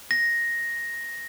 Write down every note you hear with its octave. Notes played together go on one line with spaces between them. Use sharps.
A#6